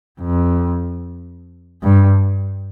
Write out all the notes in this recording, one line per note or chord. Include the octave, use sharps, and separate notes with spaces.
F2
G2